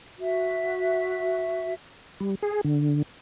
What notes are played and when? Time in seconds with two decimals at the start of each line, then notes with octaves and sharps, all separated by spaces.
0.18 F#4 E5
2.20 G3
2.42 G#4
2.65 D3